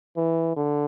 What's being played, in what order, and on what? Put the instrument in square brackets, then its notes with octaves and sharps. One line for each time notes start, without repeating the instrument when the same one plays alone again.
[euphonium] E3
D3